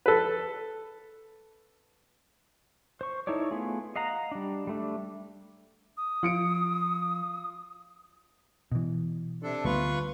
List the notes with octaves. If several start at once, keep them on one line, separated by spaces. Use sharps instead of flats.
A4 B4
C5 C#6
D#4 E4 A4 C#5 D5
A3 B3 F4 G#4
D#5 F5 F#5 A#5
G3 D4
G3 A3 D4
D#6
F3 F4 C#7 D7
B2 E3
C3 D4 A4
D2 G3 B3 F4 B4 C#6